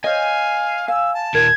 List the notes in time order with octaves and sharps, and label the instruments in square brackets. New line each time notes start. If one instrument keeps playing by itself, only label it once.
[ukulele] C5 C#5 D#5 [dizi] F5 [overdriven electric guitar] G#5
[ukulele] F5 [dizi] E6
[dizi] A5
[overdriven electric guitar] D#2 A#2 [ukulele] A#4 [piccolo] G#6